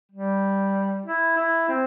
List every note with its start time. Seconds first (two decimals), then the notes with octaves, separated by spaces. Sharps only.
0.12 G3
1.06 E4
1.37 E4
1.69 C4